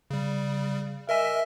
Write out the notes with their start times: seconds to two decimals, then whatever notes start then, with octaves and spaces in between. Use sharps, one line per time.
0.11 C#3 G3
1.09 A#4 D#5 E5 G#5